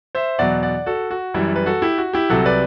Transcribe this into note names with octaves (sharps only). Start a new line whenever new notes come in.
C5 E5
E2 B2 F#3 D5 F#5
D5 F#5
F#4 A4
F#4
F#2 E3 G3 E4
B4
F#4 A4
E4 G4
F#4
E4 G4
C2 C3 F#3 F#4 A4
B4 D5